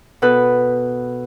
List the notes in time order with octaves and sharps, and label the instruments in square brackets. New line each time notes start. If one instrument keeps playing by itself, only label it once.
[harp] B2 A4 B4